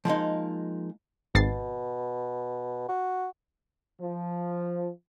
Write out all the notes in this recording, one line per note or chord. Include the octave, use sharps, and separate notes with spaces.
F3 G#3 A#3 D#4
G#1 B2 A6 C7
F#4
F3